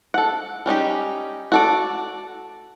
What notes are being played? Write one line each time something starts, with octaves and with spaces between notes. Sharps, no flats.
A4 F#5
G3 C#4 D#4 G4
F#4 A4 D5